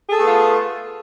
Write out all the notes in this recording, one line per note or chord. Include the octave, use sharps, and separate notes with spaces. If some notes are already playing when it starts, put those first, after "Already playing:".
A3 B3 F4 G#4 A4